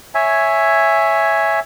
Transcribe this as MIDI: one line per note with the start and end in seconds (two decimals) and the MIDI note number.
0.15 1.60 73
0.15 1.60 76
0.15 1.60 80